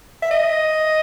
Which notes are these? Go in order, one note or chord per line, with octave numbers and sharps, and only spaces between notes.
E5
D#5